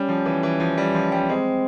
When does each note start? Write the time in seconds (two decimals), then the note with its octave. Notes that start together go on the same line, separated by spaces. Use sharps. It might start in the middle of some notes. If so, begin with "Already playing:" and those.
Already playing: G3 C#4
0.09 F3
0.26 E3
0.43 E3
0.60 F3
0.78 G3
0.95 F3
1.12 G3
1.29 G#3 C4